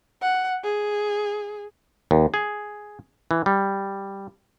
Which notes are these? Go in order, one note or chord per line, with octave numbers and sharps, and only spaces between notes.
F#5
G#4
D#2
G#4
E3
G3